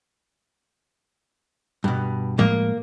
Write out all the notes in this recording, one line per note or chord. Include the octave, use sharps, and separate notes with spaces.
G2 B2
A2 F3 G#3 A#3